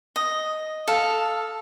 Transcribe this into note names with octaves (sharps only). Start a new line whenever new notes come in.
D#5
A4 F5